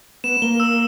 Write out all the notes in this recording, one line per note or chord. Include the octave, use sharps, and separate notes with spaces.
B3 E7
A#3 G7
E6